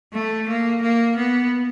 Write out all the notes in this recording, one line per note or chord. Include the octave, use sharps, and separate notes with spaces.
A3
A#3
A#3
B3